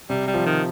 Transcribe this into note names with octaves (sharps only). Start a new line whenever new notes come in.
C3 G3
G3
F3
D#3